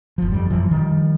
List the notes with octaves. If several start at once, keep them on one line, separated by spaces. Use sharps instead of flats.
G1 F3
F2 G3
F#2 E3 F3
D#3 F3 G3